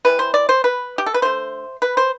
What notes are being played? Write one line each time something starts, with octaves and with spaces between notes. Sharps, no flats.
C3 E3 G3 B4
C5
D5
C5
B4
G4
A4
B4
D3 A3 C5
B4
C5